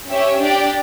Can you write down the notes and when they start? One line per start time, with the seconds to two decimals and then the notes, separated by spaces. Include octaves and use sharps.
0.09 C#4 G4 C#5 E5
0.41 D4 G4 D5 G5